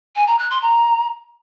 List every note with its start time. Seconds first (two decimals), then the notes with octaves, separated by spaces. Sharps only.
0.16 G#5
0.27 A#5
0.39 F#6
0.50 C6
0.62 A#5